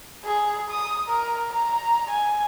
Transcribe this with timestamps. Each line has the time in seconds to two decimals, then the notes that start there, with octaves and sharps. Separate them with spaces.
0.25 G#4
0.71 D#6
1.09 A#4
1.53 A#5
2.10 G#5